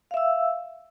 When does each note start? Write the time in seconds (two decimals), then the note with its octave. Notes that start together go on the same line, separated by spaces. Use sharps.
0.11 F5
0.14 E5
0.17 E6